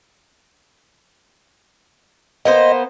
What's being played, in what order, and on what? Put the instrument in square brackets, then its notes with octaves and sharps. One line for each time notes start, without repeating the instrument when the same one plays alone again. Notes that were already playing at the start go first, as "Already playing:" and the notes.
[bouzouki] A#3 B3 C5 [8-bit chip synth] D#5